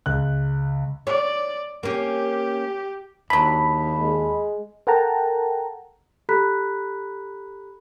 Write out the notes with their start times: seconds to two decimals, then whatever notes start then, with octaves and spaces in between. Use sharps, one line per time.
0.06 C#2 F#6
1.07 C#5 D5
1.83 A#3 C#4 G4
3.30 D#2 D3 F#3 B5
3.98 G#3
4.87 A4 A#4 F#5 G5 A5 A#5
6.29 G4 A4 A#5 B5 F#6 B6